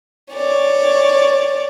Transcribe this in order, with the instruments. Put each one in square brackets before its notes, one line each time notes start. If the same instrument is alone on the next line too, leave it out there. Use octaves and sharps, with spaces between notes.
[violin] C#5 D5